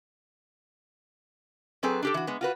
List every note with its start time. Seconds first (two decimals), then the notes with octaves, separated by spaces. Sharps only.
1.83 F#3 C4 G#4 A4 B4
2.02 D4 G4 A4
2.14 E3 F#4
2.27 G#3 B3
2.41 F4 F#4 B4